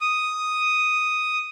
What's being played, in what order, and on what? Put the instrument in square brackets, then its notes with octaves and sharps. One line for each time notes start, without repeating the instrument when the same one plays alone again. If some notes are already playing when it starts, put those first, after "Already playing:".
[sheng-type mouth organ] D#6